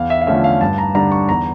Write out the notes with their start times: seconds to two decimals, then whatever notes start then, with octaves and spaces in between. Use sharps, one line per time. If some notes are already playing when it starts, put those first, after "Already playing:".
Already playing: E2 F5
0.10 E5
0.22 F5
0.27 D3 F3 A3 C#4 E5
0.44 F5
0.61 G2 A5
0.78 A#5
0.94 D3 G3 D4 A#5
1.12 C#6
1.29 E2 A#5